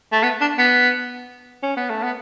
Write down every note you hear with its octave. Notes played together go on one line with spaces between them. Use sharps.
A3
B3
D4
B3
C#4
B3
A3
B3